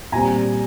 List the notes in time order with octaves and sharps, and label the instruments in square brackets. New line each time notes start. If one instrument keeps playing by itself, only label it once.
[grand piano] A#2 G3 C4 G#5 A#5